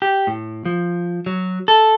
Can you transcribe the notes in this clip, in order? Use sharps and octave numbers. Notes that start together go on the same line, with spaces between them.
G4
A2
F3
F#3
A4